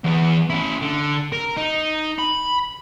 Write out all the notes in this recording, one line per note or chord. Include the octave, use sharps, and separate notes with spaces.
E2 B3
C#4 E4
D3
A#4
D#4
B5